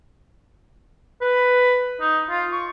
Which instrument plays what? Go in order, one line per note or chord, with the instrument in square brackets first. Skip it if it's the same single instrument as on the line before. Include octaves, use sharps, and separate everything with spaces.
[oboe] B4
D#4
F4
C#6